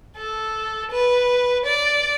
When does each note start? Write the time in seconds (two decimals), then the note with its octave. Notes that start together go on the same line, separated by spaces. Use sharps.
0.17 A4
0.91 B4
1.65 D5